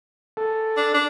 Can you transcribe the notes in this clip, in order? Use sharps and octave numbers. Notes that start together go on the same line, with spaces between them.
A4
D4
D4